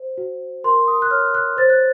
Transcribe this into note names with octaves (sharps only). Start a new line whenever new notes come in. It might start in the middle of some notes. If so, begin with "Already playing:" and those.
Already playing: C5
F#4
A#4 C6
D#6
F#6
C#5 F6
F#6
C5 A6
F#6